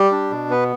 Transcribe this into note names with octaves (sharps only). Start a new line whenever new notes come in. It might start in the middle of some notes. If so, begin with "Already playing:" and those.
Already playing: G3 G4
D4
B2
B3 B4